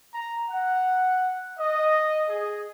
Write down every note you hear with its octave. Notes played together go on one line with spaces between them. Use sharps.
A#5
F#5
D#5
G#4